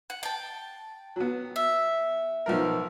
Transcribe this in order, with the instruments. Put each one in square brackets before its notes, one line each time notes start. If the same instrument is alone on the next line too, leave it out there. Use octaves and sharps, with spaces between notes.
[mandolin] F#5
G5 A5
[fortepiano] F#3 B3
[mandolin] E5
[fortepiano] B1 F3 A#4